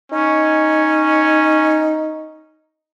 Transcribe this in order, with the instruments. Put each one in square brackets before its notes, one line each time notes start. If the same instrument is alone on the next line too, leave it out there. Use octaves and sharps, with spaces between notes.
[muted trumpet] C#4 [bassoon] D#4